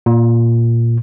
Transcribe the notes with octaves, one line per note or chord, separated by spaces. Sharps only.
A#2